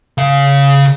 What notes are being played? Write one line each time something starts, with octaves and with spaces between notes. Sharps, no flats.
C#3 F5